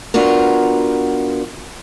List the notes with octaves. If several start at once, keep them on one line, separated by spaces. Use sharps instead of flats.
B3 D4 F4 F#4 A#4